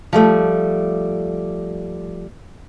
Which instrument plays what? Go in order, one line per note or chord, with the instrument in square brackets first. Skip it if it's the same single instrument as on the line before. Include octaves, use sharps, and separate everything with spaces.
[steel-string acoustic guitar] F3 G3 A3